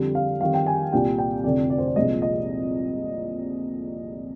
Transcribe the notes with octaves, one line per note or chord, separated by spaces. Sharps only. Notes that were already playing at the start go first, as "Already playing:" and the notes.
Already playing: F2 D3 G3
F5
F2 D#3 G3 F5
G5
G#5
C2 A#2 G3 G5
G5
F1 F2 D3 D5
D5
C5
D5
C2 A#2 F3 G#3 D#5
D#5